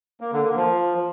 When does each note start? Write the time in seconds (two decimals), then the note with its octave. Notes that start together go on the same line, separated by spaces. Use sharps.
0.21 A#3
0.32 D3
0.44 A#3
0.56 F3